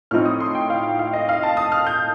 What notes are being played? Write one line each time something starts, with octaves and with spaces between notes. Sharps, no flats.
A2 F3 C4 D#4 F6
D#6
C6
G5
F5
F5
D#5
F5
A5
D#6
F6
G6